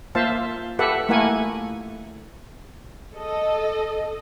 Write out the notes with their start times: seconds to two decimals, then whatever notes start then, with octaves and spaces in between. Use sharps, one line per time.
0.15 A#3 F4 C5 E5 F5 A5
0.79 G4 A4 B4 E5 F#5
1.09 A3 A#3 E4 A#4 F#5 G#5
3.16 A4 D#5